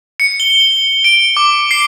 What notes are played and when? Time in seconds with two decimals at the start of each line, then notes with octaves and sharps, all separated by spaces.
0.20 C#7
0.40 G7
1.04 D7
1.37 D6
1.71 C7